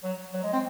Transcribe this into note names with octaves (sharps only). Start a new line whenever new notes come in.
F#3
F#3
G#3
C4